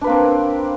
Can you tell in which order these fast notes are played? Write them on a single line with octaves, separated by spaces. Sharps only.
D4 B4 A#3 C4